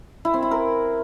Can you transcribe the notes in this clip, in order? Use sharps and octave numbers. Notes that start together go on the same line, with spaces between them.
E4
C4
E4
A#4